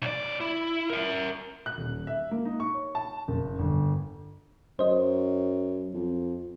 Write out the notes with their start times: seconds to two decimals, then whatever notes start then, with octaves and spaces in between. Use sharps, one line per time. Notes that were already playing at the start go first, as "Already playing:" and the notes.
0.02 B1 D5
0.41 E4
0.90 A#4 E5
1.66 F#6
1.78 D#1
2.07 E5
2.31 A#3
2.45 D#4
2.60 C#6
2.74 C#5
2.95 A5
3.28 F#1
3.59 G1
4.79 F#2 C5 D#5
5.94 F2